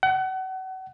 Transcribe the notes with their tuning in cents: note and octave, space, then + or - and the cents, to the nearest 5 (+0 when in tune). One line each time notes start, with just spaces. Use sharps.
F#5 +35